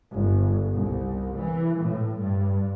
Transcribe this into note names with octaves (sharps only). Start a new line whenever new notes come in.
G1
C2
E3
A2
G2